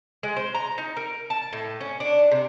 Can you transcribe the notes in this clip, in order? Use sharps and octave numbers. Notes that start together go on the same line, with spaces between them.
G#3
C5
A#5
D#4
A#4
A5
A2
C#4
D4
C3